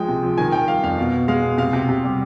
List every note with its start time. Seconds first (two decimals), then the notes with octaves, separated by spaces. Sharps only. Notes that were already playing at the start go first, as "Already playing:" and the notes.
Already playing: F3 G#3 G5
0.08 C3
0.23 F3
0.38 D#3 G#5
0.52 D#3 G5
0.67 G3 F5
0.83 F2 F5
0.98 B2 F5
1.13 B2
1.28 G#3 F5
1.43 B2
1.58 C3 F5
1.73 C3
1.89 C3
2.04 G3